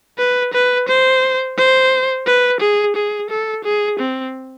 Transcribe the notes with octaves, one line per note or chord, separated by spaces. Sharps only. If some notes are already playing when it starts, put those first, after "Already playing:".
B4
B4
C5
C5
B4
G#4
G#4
A4
G#4
C4